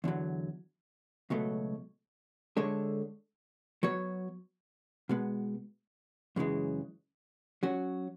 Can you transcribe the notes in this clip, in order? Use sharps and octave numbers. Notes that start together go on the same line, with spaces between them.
E2 D3 F#3
C#2 B2 F#3 A3
D3 G#3 D4 A4 C#5
F#3 B3 F#4 C#5
B2 G#3 B3
F#2 C#3 E3 G#3
F#3 C#4 F#4